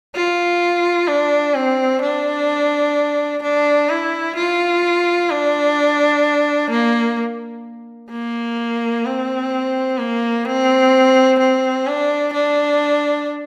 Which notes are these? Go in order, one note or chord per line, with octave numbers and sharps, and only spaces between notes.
F4
D4
C4
D4
D4
E4
F4
D4
A#3
A#3
C4
A#3
C4
C4
D4
D4